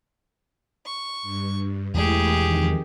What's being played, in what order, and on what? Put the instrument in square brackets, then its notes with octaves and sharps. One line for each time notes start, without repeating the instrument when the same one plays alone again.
[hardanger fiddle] C#6
[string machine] G2
[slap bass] E2 G#3 [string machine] E3 A3 E4 [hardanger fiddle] G4 G#4
[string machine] F2 D#3